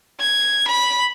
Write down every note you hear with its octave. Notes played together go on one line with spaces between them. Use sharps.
G#6
B5